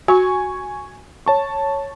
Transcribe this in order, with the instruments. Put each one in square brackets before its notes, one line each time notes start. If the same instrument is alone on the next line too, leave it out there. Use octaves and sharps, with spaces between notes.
[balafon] F#4 [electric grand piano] G#5 C#6
[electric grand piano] C#5 A5 C#6